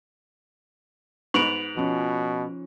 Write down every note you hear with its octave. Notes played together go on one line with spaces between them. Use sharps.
G#2 B3 C#6 D7 F7 F#7
B2 F3 C#4